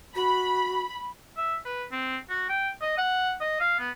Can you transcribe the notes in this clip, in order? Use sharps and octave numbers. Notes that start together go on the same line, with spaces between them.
F#4 B5
E5
B4
C4
F#4
G5
D#5
F#5
D#5
F5
B3